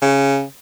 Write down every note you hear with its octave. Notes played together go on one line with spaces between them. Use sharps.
C#3